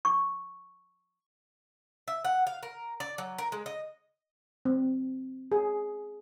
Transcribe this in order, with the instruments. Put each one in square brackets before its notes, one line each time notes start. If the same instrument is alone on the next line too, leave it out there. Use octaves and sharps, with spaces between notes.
[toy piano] C#6
[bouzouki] E5
F#5
F5
A#4
D5
F#3
A#4
G#3
D#5
[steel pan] C4
G#4